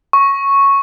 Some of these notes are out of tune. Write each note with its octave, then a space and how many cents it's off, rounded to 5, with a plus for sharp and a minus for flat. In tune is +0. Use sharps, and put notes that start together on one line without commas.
C#6 -5